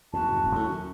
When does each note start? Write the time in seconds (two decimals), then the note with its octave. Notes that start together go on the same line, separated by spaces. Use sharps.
0.13 F#1 E2 F#4 A5
0.28 F2 G#2 C3
0.43 D1 G#1 A#3
0.55 D#2 A2
0.68 F#2